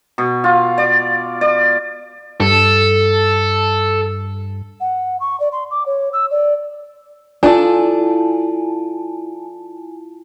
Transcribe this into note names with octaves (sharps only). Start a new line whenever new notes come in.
B2
F4
D5
D5
G2 A4
F#5
C#6
D5
C6
D6
C#5
E6
D5
D4 E4 F4 A4 G#5 A5